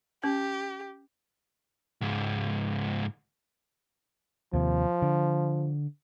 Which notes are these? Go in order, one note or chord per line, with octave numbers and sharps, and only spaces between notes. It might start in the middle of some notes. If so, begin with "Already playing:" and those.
C#4 G4
C#2 G#2
D#2 C3 F3
D3